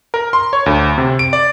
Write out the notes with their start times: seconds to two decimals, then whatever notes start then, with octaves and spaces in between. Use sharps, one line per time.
0.14 A#4
0.33 C6
0.53 C#5
0.66 D2
0.98 C3
1.19 D7
1.33 D5